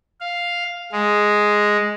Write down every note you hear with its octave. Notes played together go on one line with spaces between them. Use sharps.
F5
G#3